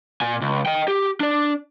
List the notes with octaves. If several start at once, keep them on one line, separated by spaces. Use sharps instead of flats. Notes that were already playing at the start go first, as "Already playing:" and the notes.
A#2 G#5
C#2
D#5 G5
G4
D4 D5